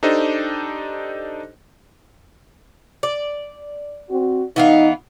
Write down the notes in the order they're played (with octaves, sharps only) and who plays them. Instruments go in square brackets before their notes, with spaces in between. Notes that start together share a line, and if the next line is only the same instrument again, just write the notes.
[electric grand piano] D4 D#4 G4 A4 C5 D#5
[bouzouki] D5
[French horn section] C4 F#4
[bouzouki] E3 B3 F4 [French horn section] D#4